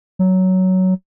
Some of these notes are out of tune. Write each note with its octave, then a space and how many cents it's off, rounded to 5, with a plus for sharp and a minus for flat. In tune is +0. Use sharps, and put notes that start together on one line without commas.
F#3 +10